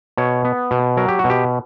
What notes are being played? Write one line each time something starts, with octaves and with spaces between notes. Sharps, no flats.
B2 C#5
B3
B2
F#3 A#4
G4
F#4
B2
G4